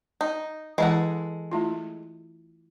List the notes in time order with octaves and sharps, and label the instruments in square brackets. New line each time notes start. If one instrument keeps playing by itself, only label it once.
[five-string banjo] D#4
[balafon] E3 E4 [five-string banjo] G#3 A4 F#5
[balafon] A3 E4 F4